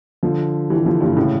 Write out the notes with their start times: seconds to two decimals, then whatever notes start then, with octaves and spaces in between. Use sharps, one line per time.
0.23 D3 F3
0.70 E3 G3
0.86 D3 F3
1.00 G2 A#2
1.16 A2 C#3